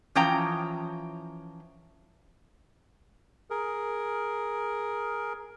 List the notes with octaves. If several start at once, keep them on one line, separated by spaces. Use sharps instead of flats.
E3 F3 C#4 G5 A#5
G#4 A#4